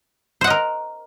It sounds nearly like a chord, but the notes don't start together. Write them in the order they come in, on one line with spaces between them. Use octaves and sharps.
C5 F#5 D#5 A#4